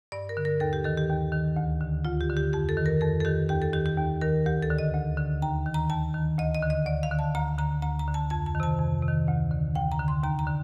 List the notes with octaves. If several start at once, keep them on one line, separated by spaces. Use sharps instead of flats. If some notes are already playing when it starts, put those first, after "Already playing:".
G2 D5
A#4
D3
A#4
D#2 A4
G4
D#3 A4
G4
D#2
D#3
D2
D3
D2 F4
G4
D3
G4
F2 G4
A4
D#3
A#4
F2 A4
A4
D#3 G4
D#2 G4
A4
D#3 G4
G4
D#2
D#3 A#4
D2 G4
A4
D3
D#5
D2
D3
D#2 A#5
D#3
A#5
D#2 A5
D#3
D2 D#5
D#5
D3
D#5
D2 D5
F5
D3
A5
D2 A#5
D3 A#5
D2 A#5
A#5
D3
A5
F2 A5
A5
D#3
C3 A5
F2
C3
D#3
D2
D3
D2 G5
A#5
D3
C6
D#2 A#5
A#5
D3